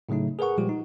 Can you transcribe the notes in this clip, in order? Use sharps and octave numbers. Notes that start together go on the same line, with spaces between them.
A2 C#3 F#3 A3 D#4
G#4 A#4 B4 F#5 C#6
A#2 F3 G3 G#3 F4 G4
D#4